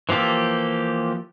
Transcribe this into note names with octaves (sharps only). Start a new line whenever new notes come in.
E3 F3 A#3 G4 A4